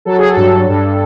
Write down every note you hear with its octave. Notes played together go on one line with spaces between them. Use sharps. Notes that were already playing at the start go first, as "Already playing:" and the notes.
F#3 A4
G#4
A4
G2
G2